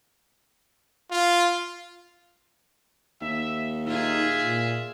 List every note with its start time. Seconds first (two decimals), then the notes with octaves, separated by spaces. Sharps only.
1.11 F4
3.21 D#2 E5
3.87 D#4 F4 G#4 E5
4.42 A#2